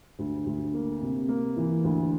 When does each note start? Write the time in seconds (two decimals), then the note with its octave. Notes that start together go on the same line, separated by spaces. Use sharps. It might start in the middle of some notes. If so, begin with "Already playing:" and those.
0.19 D2
0.46 D2
0.74 A#3
1.01 C3
1.29 A#3
1.57 E3
1.84 D2